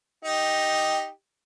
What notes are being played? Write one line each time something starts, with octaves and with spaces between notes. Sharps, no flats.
D#4 G4